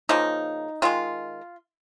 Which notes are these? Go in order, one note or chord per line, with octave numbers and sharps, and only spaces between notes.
C#3 F3 A#3 D#4
D#3 G#3 F4